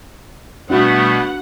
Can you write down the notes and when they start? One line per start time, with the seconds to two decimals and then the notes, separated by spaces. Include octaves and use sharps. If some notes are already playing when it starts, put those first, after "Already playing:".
0.70 B2 G3 A3 B3 D4 F#4 F#5